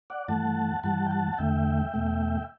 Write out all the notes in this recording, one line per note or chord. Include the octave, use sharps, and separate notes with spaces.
D5 F#5
G2 E3 A3 F#5 A5
G2 E3 G3 F#5 A5
G5
F#5 A5
F#5
E2 D3 A3 E5 G5
E2 B2 A3